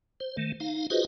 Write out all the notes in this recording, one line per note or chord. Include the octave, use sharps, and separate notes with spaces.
C5
D#3 A3
D#4 F5
F4 F#4 G#4 B4 C5 D#5